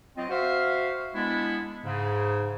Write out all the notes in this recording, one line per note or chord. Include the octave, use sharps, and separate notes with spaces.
F#3 C4 F4 D#5
F#4 C5 E5 F5
G#3 B3 D4 E4
G#2 C#3